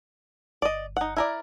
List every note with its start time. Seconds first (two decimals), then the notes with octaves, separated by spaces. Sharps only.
0.62 G1 D5 D#5
0.97 D#4 F#5
1.17 E4 A#4 D5